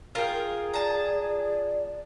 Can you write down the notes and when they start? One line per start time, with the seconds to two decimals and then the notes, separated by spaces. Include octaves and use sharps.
0.15 F4 G#4 A#4 G5
0.74 D5 A5 A#5